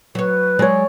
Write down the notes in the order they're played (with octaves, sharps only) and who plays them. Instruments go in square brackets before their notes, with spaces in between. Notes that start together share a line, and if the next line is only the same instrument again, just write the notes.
[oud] F#3 C#5 [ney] B4
[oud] F#3 G#3 [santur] C#5 D5